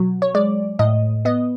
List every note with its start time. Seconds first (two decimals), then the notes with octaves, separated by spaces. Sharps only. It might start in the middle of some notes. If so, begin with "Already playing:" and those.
Already playing: B2 F#3
0.22 C#5
0.34 G#3 D5
0.79 A2 D#5
1.25 B3 D#5